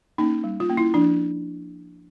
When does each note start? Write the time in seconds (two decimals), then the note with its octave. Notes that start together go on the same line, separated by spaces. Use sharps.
0.18 A#3 C#4 D#4
0.44 G3
0.60 F4
0.70 A#3 C#4
0.77 E4
0.94 F3 D4